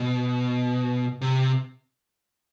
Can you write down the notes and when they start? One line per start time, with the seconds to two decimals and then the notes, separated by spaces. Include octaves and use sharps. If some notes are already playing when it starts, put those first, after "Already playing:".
Already playing: B2
1.21 C3